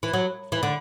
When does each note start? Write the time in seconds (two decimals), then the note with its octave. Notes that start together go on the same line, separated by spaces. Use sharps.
0.03 E3
0.13 F#3
0.52 E3
0.63 D3